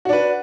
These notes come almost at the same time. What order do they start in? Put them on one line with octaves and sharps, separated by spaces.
F#4 D4 B4